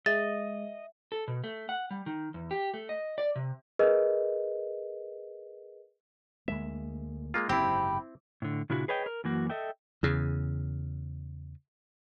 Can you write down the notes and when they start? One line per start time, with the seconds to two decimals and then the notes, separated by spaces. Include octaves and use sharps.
0.06 G#3 D#5 E5 A6
1.12 A4
1.28 B2
1.44 A3
1.69 F#5
1.91 G3
2.06 D#3
2.34 E2
2.51 G4
2.74 A3
2.89 D#5
3.18 D5
3.36 C3
3.79 G#4 A#4 B4 D#5
6.48 D2 G#3 A#3 E5
7.34 G#3 A#3 F4
7.49 F#1 G#2 C3 C4 E4 G4 B5
8.42 A2 D3
8.70 A#2 C#3 D4 E4 F#4
8.88 G#4 B4 C#5 D#5 G5
9.06 A#4
9.24 F#2 E3 A#3 F#4
9.50 A4 D#5 E5 G5
10.03 E2 C#3